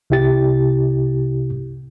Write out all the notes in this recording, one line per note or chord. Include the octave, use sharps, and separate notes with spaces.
C2 C3 E4 G4 A6